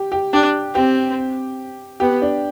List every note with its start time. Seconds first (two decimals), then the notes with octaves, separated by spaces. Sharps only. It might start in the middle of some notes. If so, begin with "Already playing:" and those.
Already playing: G4
0.12 G4
0.33 D4 G4
0.74 C4 G4
2.00 B3 G4
2.22 D4